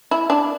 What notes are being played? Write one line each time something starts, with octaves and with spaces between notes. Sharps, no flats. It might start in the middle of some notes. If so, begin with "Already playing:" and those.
E4
D4